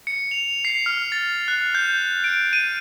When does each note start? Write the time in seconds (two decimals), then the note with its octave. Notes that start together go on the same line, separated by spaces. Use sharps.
0.07 C#7
0.31 F7
0.65 C7
0.86 F6
1.12 A6
1.48 F#6
1.75 G6
2.24 D7
2.53 D#7